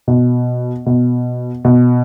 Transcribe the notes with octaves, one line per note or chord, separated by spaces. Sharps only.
B2
B2
B2